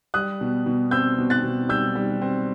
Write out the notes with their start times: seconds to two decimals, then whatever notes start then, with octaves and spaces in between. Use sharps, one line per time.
0.14 G3 D#6 F#6
0.41 B2
0.66 B2
0.91 C4 E6 G6
1.18 B2
1.30 F#6 A6
1.44 B2
1.69 G3 E6 G6
1.95 G3
2.22 C4